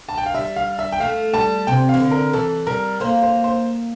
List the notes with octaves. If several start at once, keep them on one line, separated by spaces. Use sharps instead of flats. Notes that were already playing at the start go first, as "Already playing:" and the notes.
A5
G5
F5
G3 E5
F5
E5
G5
A3 F5
G3 A5
C3 G5
E3 F5
D3
A#4
E3 A4
G3 A#4
A#3 C5
C5
C5